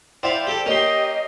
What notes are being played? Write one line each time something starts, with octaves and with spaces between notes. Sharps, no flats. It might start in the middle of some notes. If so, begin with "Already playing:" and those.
E4 C5 D5 F5 G5
G4 A4
A#3 C#4 G4 D#5 C6